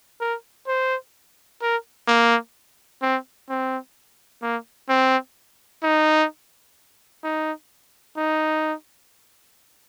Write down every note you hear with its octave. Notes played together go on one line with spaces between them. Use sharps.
A#4
C5
A#4
A#3
C4
C4
A#3
C4
D#4
D#4
D#4